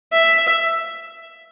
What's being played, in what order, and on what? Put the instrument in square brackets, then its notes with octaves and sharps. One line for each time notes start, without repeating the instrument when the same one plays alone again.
[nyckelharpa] E5